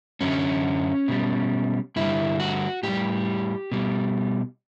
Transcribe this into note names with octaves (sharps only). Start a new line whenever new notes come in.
F#2 D3 F#3 C#4
B2 G3
G2 D3 G3 E4
F#4
A2 G3 G4
B2 G3